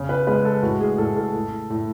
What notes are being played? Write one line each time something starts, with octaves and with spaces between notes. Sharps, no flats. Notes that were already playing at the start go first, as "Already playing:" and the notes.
Already playing: C#3
B4
G#3 B4
A4
A2 F#4
G#4
A2 A4
A4
A2
A2